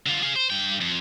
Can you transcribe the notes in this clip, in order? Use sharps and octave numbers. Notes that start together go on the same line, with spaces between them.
D3 F4
G#4 F5
C5
G2 G5
F2